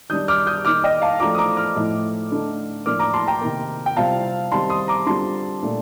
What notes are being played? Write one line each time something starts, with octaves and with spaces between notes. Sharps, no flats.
D#3 G3 D4 D#6 G6
D6 F6
D#6 G6
D#3 A#3 D#4 D6 F6
D#5 G5
F5 A5
F3 A3 D4 F4 A#5 D6
D#6
A#5 D6
D6 F6
A2 F3 A3 D#4
D3 A3 D#4
A2 F3 A#3 D4 D6 F6
A#5 D6
A5 C6
G5 A#5
C3 D#3 A#3
G5
C3 G3 C4 F4 F5 A5
D#3 G3 C4 A5 C6
C6 D#6
A#5 D6
D3 G3 C4 F4 A5 C6
A#2 A3 D4